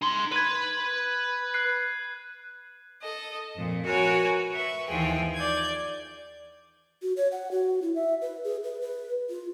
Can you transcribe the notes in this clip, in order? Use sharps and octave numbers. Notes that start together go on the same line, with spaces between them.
D#4 C6
B4 G#6 D#7
F#6 C7
A4 D#5
F2 A#2
F#4 A#4 B4 C#5 G#5
B4 E5 C#6
D#2 E3 F3 G#4 G5
D5 G6 G#6
F#4
C#5
F#5
F#4
E4
E5
B4
G#4
B4
B4
F4